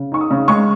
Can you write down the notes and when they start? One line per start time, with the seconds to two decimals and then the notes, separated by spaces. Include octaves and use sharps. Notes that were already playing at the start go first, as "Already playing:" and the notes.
Already playing: C#3
0.12 D#4 C#6
0.21 D#6
0.31 C#3
0.48 G#3 C#6